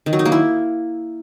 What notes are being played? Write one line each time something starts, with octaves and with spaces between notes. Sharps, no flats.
D#3
F#3
D#4
A#3
E4